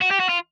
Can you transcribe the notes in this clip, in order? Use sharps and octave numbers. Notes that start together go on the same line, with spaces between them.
F#4
G4
F#4
F4